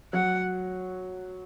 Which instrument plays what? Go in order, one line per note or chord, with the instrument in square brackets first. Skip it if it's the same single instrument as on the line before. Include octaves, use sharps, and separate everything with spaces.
[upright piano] F#3 [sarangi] F#5